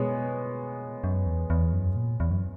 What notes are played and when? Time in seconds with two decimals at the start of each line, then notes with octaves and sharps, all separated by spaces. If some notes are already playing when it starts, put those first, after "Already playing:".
Already playing: B2 G#3 B3 C#5
1.04 F#2
1.26 E2
1.50 E2
1.73 F#2
1.96 A#2
2.20 E2
2.31 F#2